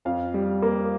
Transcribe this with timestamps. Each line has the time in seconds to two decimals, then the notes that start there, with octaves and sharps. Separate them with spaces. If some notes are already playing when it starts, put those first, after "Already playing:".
0.05 F2 F5
0.34 G3
0.62 A#3